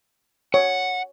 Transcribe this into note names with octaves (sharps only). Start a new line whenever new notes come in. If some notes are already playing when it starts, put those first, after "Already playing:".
C#5 F#5